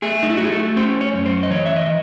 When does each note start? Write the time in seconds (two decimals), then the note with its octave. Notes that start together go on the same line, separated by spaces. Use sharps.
0.02 A3 G#4
0.23 D#4
0.30 E4
0.37 A3 F#4
0.45 G#4
0.52 A4
0.76 C#4 C5
1.01 C#5
1.13 F#2
1.26 C5
1.43 D#5
1.51 E3 C#5
1.65 E5
1.76 D#5
1.87 E3